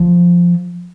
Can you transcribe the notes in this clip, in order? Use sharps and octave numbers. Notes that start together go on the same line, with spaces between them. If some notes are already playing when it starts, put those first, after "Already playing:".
Already playing: F3